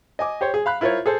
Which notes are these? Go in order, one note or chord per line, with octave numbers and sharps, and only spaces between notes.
D#5 G#5 D6
G4 C5 C#5
G#4
F5 B5 F#6
E4 F4 A#4 C5 C#5
G#4 A4 C5